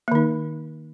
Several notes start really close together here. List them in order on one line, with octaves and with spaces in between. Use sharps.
A#3 D#3 D#4